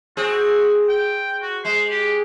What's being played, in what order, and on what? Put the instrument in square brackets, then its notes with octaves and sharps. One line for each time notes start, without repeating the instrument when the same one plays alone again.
[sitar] C4 G#4 [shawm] F#4
[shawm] G5
F#4
[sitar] G#3 [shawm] C5
[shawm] G4